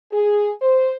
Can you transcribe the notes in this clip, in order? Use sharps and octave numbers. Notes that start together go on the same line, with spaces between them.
G#4
C5